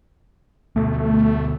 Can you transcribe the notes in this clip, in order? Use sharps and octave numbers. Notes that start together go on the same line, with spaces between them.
D2 B2 A3